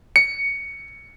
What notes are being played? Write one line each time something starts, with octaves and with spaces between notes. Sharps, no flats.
C#7